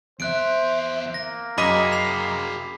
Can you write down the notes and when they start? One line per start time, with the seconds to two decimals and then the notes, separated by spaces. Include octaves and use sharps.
0.20 E2 C5 E5 F#6 D7
1.14 A#3 A#6
1.58 F#2 F#4 G#4 D#5 B5 D6 B6 D#7
1.92 C7 F7